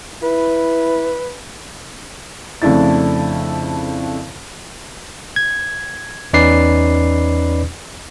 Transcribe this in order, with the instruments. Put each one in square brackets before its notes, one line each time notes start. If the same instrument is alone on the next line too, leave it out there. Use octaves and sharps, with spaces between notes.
[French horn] E4 [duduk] B4
[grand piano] F2 C#3 A3 D4 E4 A6
[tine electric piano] G#6
E2 C#4 D#4 B4 D5 C7